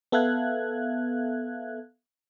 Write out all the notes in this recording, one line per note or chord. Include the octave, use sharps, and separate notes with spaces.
B3 A4 E5 F5 F#6 G#6